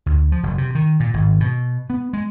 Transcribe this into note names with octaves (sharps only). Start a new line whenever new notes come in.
D2
F3
F#1
C3
D#3
A#2
G#1
B2
B3
G#3